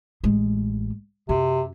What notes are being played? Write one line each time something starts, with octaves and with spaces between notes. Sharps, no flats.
A1 G#3
F#2 C3